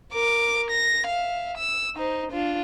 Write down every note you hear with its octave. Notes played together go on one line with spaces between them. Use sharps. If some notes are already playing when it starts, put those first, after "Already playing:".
A#4 D6
A#6
E5 F5
E6
D#4 C5
D4 F4